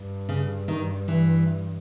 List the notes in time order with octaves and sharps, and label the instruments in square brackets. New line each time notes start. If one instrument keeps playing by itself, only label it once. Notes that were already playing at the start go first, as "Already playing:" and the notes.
Already playing: [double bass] G2
[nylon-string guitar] C#3
D#3
E3